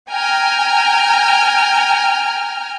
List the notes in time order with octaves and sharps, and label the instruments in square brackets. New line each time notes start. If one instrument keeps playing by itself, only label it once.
[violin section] G5 G#5 A#5 F6